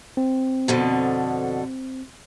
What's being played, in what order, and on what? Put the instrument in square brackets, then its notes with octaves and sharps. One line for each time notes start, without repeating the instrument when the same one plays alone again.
[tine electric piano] C4
[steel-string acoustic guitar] F2 B2 D3